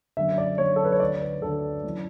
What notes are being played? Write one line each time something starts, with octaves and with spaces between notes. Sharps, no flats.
F#2 D3 E5
D5
F#2 D3 C#5
A4
B4
C#5
D2 D3 D5
B4
D2 D3 A4
F#2 E3